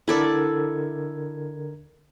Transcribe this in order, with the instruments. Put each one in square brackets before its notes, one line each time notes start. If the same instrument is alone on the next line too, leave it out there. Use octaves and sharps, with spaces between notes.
[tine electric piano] D3 A#4 G#6 [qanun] E4 A4 D5